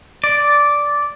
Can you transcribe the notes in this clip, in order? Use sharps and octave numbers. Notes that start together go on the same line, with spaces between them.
D5